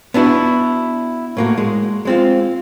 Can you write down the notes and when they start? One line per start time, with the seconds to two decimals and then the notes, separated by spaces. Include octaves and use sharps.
0.14 B3 D4 E4 F#4
1.37 A2 A#3 F#4
1.58 G#3
2.05 G#3 C4 F4